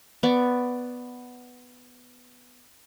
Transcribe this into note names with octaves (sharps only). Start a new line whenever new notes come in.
B3 D5 C#6